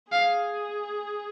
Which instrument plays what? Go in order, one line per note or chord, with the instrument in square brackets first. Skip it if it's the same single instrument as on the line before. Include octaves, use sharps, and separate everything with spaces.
[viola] G#4 [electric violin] F5